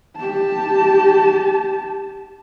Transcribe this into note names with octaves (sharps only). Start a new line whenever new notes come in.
G4 A5